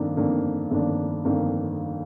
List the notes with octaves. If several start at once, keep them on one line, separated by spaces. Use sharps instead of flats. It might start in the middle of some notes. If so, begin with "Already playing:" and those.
Already playing: G1 F2 D#3 A#3 D4
G1 F2 D#3 A#3 D4
G1 F2 D#3 A#3 D4
G1 F2 D#3 A#3 D4